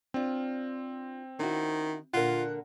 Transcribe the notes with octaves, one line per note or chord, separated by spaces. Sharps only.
C4 D4 F4
D#3 C#4 E4 F#4
A#2 D3 F4 A#4 F#5